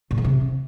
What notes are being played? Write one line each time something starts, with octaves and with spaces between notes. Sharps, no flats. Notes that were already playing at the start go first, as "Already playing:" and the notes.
A#2
E2
C3